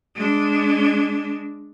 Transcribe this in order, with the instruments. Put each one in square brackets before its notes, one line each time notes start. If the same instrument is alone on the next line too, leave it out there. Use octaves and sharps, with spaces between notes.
[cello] G#3 D4